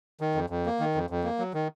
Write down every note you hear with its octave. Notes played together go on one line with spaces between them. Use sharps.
D#3
F2
F2
A#3
D#3
F2
F2
A#3
F#3
D#3